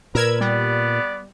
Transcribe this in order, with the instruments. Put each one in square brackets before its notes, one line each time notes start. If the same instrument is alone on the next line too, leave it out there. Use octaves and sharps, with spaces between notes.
[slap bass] A#2 [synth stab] A#4 E6 G#6 [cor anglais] B4
[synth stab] G3 [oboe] B3 [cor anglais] D5